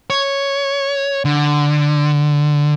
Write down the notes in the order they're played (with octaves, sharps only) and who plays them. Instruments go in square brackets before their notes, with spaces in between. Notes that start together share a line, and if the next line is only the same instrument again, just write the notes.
[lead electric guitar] C#5
D3